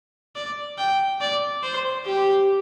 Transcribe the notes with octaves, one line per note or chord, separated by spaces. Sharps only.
D5
G5
D5
C5
G4